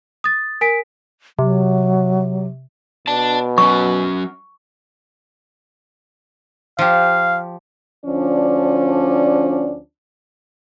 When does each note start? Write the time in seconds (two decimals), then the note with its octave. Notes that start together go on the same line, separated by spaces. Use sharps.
0.24 D#6 A6
0.61 A#4 G#5 B6 D7
1.39 C3 F#3
3.07 B2 D5 A5
3.58 F#3 C#4 C#6
6.79 F3 G4 F5
8.06 D2 F3 C#4 D4 D5